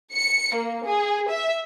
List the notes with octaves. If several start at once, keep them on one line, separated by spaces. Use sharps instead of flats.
C#7
A#3
G#4
E5